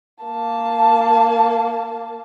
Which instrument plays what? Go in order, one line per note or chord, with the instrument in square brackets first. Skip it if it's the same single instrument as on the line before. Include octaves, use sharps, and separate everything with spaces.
[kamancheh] A#3 A5